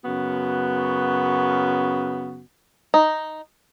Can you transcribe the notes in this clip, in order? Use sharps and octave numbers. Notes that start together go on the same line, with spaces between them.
F#2 C#3 B3 F#4
D#4